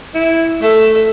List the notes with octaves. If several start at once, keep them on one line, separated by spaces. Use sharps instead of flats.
E4
A3 A4 E5